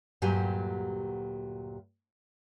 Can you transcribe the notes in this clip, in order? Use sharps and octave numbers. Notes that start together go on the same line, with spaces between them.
D2 G2 A#2 F#3 G4 G#5